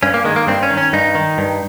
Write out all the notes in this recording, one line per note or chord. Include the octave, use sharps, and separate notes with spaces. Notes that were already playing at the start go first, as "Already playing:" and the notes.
G2 C#4
A#3
D#3 G#3
A#3
G2 C4
C#4
D#3
C#4
G2 D#4
D#3
G2